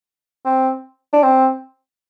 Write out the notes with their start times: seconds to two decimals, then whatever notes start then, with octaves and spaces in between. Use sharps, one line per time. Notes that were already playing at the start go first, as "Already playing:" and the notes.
0.45 C4
1.13 D4
1.23 C4